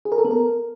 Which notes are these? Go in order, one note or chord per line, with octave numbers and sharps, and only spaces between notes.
G#4
A#4
A4
B3
A#4